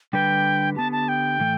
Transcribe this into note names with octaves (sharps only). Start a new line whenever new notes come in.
D3 G3 D4 B4 G5
D3 B3 G4 A5
A5
G5
A2 E3 A3